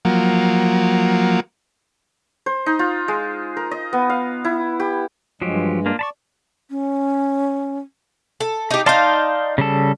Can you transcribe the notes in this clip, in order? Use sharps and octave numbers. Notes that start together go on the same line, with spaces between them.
F3 F#3 A#3
C5
D#4
F4
G#3
A#4
D#5
B3
F5
E4
G4
G2 F3 F#3 G#3 G4
A#3 D4 F4
D5 A5 B5 C#6
C#4
A4
D#4 G4
D#4 D5 F5 A5 C6
C#3 G3 A4